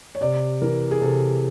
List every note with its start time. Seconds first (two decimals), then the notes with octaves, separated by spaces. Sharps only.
0.15 C#5
0.21 C3 D5
0.62 E3 A#4
0.91 G#4
1.01 C3 A4